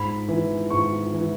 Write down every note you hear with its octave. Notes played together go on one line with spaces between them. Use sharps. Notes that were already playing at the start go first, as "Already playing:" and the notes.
Already playing: G#2 B5
E3
G#2 C#6
E3